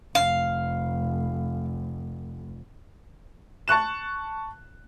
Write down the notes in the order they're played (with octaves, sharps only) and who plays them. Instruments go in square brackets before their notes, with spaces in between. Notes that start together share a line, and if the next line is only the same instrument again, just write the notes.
[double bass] F1 [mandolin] F5
[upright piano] A5 C#6 F#6 E7